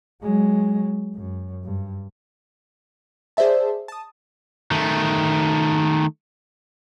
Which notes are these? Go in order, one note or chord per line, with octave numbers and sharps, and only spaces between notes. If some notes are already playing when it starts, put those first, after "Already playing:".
F#3 G#3
F#2
G2
G#4 C5 D5 E5 A5
A5 D#6
D#3 A3